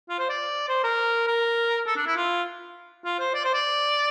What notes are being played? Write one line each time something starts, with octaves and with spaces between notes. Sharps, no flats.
F4
C5
D5
C5
A#4
A#4
A4
D4
E4
F4
F4
C5
D5
C5
D5